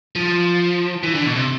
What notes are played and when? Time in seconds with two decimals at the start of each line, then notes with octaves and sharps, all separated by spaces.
0.16 F3
1.03 E3
1.15 D3
1.26 B2
1.36 C3